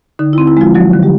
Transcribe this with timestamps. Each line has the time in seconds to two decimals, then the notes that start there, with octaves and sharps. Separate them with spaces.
0.19 D3 D#4
0.33 E4
0.38 C4
0.47 E4
0.57 F3 G#3 F4
0.75 F3 F#3 F#4
0.94 D3
1.03 G3 G4